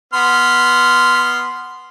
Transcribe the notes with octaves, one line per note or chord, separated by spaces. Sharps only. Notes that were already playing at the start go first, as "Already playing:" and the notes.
B3 C6 F6